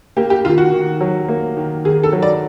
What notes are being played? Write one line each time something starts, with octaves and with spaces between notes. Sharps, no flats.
A#3 G4
G4
D#3 F4
F#4
D#3
F#3
A#3
D#3
D#3 G#4
A4
F#3
D5